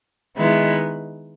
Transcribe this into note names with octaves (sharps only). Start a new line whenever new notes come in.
D#3 G#3 B3 E4